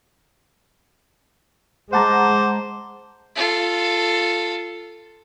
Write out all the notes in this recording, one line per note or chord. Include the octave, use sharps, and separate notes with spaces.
G#3 C5 F#5 A5 A#5 D6
F4 A4